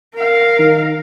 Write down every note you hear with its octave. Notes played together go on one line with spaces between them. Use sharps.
A#4 F5
D#3